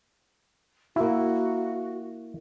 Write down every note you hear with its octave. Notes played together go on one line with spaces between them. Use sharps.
A#3 E4 F#4